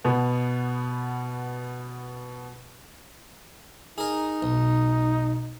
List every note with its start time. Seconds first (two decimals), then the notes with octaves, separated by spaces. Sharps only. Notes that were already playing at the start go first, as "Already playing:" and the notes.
0.04 B2 B3
3.98 D#4 G#4 A#4
4.42 B1